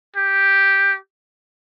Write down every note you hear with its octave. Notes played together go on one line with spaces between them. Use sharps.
G4